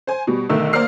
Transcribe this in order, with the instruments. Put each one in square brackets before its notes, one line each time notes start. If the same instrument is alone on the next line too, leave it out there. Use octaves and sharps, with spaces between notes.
[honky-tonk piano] C5 G#5
B2 G3
B1 D3 D#3 A3 A#4 E6
A#3 A#4 C5 D5 F6 C7